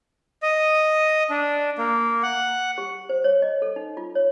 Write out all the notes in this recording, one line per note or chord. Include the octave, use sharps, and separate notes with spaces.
D#5
D4
A#3
F#5
G4
C5
C#5
D#5
A4
D#4
F4
C#5